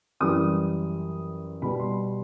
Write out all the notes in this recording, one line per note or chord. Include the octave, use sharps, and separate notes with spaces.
F#2 E3 G3 D#6
B2 G3 B5
C6